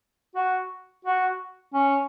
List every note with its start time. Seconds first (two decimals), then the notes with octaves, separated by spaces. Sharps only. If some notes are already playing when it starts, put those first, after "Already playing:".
0.35 F#4
1.05 F#4
1.74 C#4